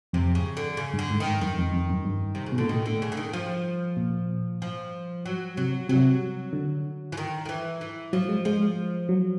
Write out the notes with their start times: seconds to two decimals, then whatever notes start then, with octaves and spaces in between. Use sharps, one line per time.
0.13 F2 C3
0.35 C#3
0.57 D3
0.77 C#3
0.94 G2
0.99 D3
1.10 G#2
1.20 D#3
1.26 G#2
1.41 F#2 D#3
1.58 F2
1.73 F2
1.90 F#2
2.05 G2
2.35 C3
2.46 C#3
2.52 B2
2.58 A#2 D3
2.69 A2 D#3
2.86 D3
3.02 C#3
3.12 D3
3.17 D#3
3.33 F3
3.97 A#2
4.62 F3
5.25 F#3
5.57 C3 F#3
5.89 C3 F#3
6.53 D3
7.12 E3
7.17 D#3
7.45 D#3
7.49 E3
7.81 E3
8.13 F3 F#3
8.29 G#3
8.45 F3 G#3
9.09 F#3